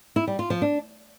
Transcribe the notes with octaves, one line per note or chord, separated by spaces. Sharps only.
E4
G3
F4
F3
D4